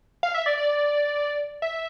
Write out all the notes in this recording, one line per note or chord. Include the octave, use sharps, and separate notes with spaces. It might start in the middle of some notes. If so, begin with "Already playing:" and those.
F5
E5
D5
D5
E5